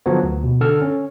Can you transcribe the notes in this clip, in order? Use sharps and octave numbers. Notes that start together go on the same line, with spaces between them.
D3 F3 F#3 B3 C#5
D2
B2
D3 A4 A5 F6
C#4